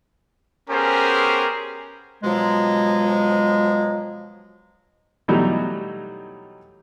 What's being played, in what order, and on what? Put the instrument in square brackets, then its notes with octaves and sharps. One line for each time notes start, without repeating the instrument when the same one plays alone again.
[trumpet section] B3 C#4 G4 G#4 A#4 C5
[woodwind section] B2 F3 F#3 G#3
[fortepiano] B2 E3 F#3 G3 A3 D#4